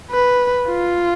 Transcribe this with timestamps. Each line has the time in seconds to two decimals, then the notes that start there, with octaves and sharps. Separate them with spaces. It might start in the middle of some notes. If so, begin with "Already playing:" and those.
0.11 B4
0.69 F4